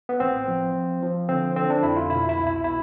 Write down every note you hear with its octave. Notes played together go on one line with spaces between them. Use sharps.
B3
A1 C4
F3
F3
F3
D3 C4
D3 C4
D4
F2 E4
F4
B2 E4
E4
C2
E4
B2 E4